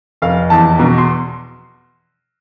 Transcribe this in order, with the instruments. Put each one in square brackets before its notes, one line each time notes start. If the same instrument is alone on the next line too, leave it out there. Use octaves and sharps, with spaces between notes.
[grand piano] F1 F5
E2 A5
B2 A#5
C6